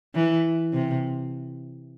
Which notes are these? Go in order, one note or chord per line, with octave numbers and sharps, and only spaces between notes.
E3
C3